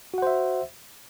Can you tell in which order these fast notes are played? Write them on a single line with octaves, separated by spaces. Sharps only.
F#4 F#5 C5 E5